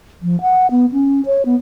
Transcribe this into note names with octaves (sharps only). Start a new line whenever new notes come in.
F3
F#5
B3
C#4
C#5
B3